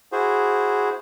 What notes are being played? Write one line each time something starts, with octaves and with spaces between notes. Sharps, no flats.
E4 F#4 G#4 C5